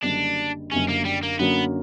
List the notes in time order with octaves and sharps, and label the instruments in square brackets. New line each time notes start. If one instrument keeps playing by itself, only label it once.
[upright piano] F#1 F#2 D3 G3 [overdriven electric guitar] D4
[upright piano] F#1 F#2 D3 G3 [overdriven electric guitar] C#4
[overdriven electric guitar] A#3
G3
A#3
[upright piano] F#2 D3 A#3 C#4 F#4 [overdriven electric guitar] B3